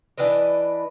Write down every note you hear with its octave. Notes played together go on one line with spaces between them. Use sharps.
E3 D4 B4 D#5